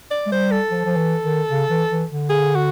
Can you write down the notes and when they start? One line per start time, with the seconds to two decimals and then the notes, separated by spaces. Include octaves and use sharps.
0.11 D5
0.26 G#3
0.31 G3 C5
0.51 A4
0.71 F3
0.85 F3
0.97 E3
1.23 D#3
1.50 C#3
1.70 E3
1.91 E3
2.10 D3
2.29 G#4
2.56 F#4